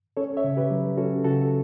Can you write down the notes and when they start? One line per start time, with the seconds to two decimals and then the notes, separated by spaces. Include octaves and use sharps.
0.17 C#4 A4 C#5
0.37 C#5 E5
0.44 C#3
0.57 G4 B4
0.71 F#3
0.97 C#4 F#4 A4
1.24 C#3 F#4 A4